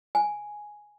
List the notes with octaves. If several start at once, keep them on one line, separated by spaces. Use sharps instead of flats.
G#5